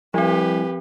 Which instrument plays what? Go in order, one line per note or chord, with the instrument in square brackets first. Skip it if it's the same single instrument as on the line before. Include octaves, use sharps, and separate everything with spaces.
[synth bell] F3 C4 [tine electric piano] G3 E4 G#5 [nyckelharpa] G4 B4